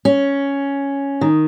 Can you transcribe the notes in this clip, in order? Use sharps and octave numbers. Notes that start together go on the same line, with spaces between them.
C#4
D#3